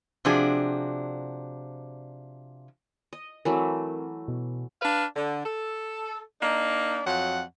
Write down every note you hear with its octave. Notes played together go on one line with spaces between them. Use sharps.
C3 F3 D4 F#4 G#4
D#5
E3 F#3 A3 C4 A#4
B2
D4 B4 F5
D3
A4
A#3 D4 D#4
F2 F#3 F4 F#5